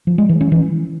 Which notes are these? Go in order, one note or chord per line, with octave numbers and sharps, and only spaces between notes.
F3
G#3
E3
C#4
E3